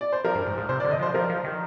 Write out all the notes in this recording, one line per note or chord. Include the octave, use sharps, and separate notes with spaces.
D5
C5
F3 A#4
G2
G#2
G#2
C3 C5
D5
D3
D#5
F3 C5
F3 A#4
F3
D#3